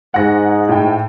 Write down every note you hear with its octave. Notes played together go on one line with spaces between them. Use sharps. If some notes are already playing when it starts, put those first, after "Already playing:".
G#2 F#5 A#6
A2 G5